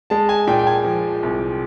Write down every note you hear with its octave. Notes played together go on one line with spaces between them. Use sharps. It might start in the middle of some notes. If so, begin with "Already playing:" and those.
G#3 A5
G#5
A#2 G5
G5
G#5
F3
C2